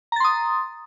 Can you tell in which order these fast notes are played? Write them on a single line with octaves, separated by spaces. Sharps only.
A#5 A6 C6 D#6